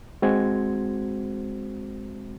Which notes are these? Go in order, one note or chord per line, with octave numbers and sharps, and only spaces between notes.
G#3 C4 F#4 C5 G#6